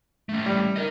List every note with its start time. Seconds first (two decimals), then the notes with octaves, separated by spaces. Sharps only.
0.29 A3 C#4
0.46 G3
0.76 A#4 D#5